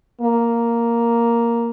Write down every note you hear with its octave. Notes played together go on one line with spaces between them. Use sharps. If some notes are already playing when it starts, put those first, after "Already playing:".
A#3